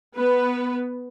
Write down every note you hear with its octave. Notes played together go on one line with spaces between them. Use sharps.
B3 B4